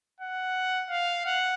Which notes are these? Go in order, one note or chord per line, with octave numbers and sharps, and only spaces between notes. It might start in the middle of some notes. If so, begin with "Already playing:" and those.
F#5
F5
F#5